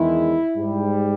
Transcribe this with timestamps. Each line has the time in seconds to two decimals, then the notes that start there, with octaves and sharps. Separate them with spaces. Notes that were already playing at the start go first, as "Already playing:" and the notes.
Already playing: E2 D#3 G#3 E4
0.55 G#2 G3